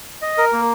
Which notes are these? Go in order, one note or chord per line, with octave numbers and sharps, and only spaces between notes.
D#5
A#4
A#3